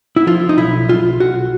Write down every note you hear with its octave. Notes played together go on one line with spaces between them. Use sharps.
E4
F3 F4
D#4
B1 E4
B1 F4
B1 F#4